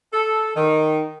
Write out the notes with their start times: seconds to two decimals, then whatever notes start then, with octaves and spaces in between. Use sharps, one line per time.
0.13 A4
0.55 D#3